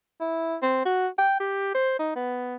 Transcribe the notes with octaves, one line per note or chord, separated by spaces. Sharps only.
E4
C4
F#4
G5
G4
C5
D#4
B3